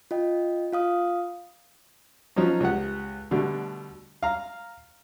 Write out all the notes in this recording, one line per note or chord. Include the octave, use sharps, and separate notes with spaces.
F4 D#5 G5
F4 F5 D#6
F3 F#3 C#4 D#4
C#2 G4 F#5
B2 D3 G3 A3
F5 A#5